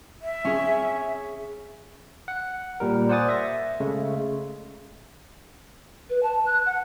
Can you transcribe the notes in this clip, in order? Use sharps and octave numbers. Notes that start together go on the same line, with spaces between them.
E5
C#4 G#4
F#5
A#2 G3 A#4
C5 D5 F#5 G#5 D#6 A6
E5 A#6
C#3 G#3 A3
B4
A5
F#6
F#5